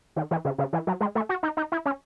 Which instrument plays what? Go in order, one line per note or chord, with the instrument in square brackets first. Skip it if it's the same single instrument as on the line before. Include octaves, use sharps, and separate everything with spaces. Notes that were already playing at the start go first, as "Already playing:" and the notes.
[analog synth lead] D#3
E3
C#3
C#3
E3
F#3
G#3
A3
F#4
D#4
D#4
E4
C#4